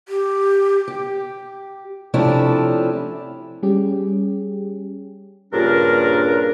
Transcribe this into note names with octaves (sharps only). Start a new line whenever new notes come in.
G4
G4
C3 F3 A3 C#4 D4 E4
G3 C#4 G4 G#4
G2 A#2 C#3 D4 A#4